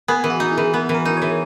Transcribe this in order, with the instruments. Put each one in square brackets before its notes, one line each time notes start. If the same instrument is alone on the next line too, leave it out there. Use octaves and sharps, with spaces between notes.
[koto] B3 [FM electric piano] G#4
[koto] E3
[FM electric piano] F#4
[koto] D#4
[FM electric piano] E4
[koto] E3
[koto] B3 [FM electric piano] G#4
[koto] E3
[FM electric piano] A#4
[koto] D#4
[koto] E3 [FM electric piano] C#5